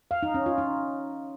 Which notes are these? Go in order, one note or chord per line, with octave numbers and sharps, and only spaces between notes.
F5
D#4
C#4
F4
D#4